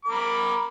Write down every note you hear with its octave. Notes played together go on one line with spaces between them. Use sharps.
A#4 B5 D6